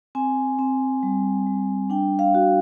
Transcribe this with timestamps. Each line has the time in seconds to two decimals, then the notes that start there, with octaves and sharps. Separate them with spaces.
0.15 C4 G#5
0.59 C4
1.03 G3
1.47 G3
1.90 D4 G5
2.19 F5
2.34 F#4